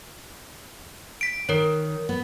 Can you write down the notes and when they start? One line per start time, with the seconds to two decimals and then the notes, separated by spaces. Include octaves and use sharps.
1.21 B6 D7
1.49 D#3 A#4 C#5
2.09 B3